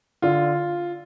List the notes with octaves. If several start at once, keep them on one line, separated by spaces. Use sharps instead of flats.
D3 F4